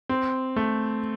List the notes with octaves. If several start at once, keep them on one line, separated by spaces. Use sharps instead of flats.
C4
A3